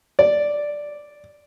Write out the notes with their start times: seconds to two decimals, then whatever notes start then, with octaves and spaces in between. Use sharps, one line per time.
0.19 D5